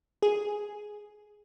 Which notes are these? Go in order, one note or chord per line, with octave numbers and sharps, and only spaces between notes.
G#4